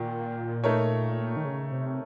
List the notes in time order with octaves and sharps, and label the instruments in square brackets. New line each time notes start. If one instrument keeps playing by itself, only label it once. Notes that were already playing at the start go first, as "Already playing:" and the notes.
Already playing: [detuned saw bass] A#2 [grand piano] D#3
[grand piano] A3 D#4 A#4 C#5
[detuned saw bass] D#3
C#3
C3